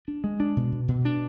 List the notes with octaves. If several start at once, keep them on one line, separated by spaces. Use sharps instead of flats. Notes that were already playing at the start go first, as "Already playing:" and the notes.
D4
G#3
D4
B2
B2
B2
D4